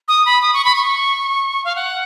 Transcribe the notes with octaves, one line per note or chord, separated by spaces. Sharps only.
D#6
B5
D#6
C#6
B5
C#6
F5
F#5